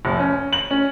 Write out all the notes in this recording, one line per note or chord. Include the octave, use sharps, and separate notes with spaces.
F1
C#4
F#7
C#4